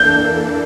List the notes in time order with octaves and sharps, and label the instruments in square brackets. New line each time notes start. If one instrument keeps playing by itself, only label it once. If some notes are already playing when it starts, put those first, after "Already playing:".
Already playing: [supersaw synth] E3 A#3 D4 A4 [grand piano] G6